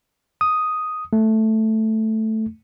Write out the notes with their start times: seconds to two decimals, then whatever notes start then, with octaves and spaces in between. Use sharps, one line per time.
0.41 D#6
1.13 A3